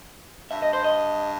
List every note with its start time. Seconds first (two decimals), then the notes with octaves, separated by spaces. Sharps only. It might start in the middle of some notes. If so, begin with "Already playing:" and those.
0.51 G2 E5
0.62 D#5
0.73 C5
0.84 D#5